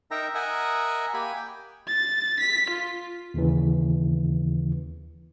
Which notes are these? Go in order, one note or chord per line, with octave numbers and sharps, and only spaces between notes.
D#4 A#4 E5 G5 A#5
A#4 D#5 E5 F#5 G#5
A#3 G4 G#5 B5
G5
A6
B6
F4
D#2 C#3 E3